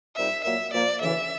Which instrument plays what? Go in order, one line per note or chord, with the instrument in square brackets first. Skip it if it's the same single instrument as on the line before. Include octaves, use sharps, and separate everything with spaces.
[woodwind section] A#2 G3 C4 D#4 [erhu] E5
[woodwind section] A#2 F#3 A#3 [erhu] E5
[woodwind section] A#2 F3 A#3 [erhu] D5
[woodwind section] D2 C#3 E3 [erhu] E5